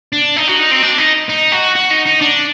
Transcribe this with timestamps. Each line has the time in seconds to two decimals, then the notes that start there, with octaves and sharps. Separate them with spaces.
0.13 D4
0.36 D#4
0.47 F#4
0.59 D#4
0.71 C4
0.82 D4
0.98 D#4
1.29 D#4
1.52 F#4
1.76 F#4
1.91 D#4
2.06 D#4
2.22 D4